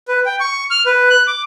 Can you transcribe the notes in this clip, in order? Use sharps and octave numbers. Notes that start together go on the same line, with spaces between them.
B4
G5
C#6
F6
B4
F#6
D6